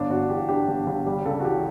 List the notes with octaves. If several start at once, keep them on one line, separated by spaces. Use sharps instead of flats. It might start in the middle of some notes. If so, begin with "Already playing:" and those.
Already playing: G1 D4
G1 F#4
E3 G4
G2 G4
G1
G1
G3 G4
C#2 A4
F#4
E3 G4